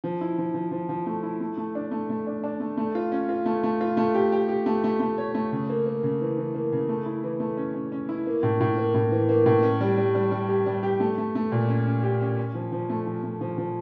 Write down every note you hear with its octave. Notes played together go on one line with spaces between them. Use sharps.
F3
E4
F3
F3
F3
F3
A3
E4
A3
A3
D4
A3
A3
D4
D4
A3
A3
F4
C#4
F4
A3
A3
F4
A3
G4
G4
G4
A3
A3
A3
C#5
A3
C#3
A#3
A#3
C#3
E3
E3
A#3
C#3
A3
E4
E3
A3
C#4
C#4
C#4
E4
A#3
A2
A2
A#3
A2
E3
A#3
A2
C#4
G3
G3
G3
G3
G4
G3
G4
A3
A3
A3
A#2
C#4
C#4
G4
C#4
C#4
F3
F3
A3
F3
A3
F3
F3